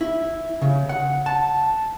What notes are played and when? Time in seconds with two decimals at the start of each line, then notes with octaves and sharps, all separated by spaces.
0.01 E4
0.61 C#3
0.89 F#5
1.26 A5